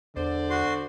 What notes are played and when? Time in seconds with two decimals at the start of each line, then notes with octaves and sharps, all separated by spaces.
0.16 E2 D3 C5 D5
0.50 F#4 C6